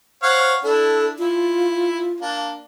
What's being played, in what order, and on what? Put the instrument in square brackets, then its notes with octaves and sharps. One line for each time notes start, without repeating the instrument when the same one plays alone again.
[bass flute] C5 [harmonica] C#5 F5 F#5
[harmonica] D4 E4 [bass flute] A4
[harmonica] E4 [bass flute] F4
[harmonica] A#3 D4